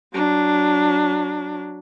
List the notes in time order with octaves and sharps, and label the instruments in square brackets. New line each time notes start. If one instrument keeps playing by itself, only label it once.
[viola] F#3 D4